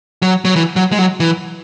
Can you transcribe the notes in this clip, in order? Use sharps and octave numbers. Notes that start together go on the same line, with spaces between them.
F#3
F#3
E3
F#3
G#3
F#3
E3